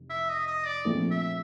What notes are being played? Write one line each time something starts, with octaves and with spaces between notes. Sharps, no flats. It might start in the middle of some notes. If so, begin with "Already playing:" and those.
Already playing: F1
E5
D#5
D#5
D5
A#1 A#2 F3 A3 C4
E5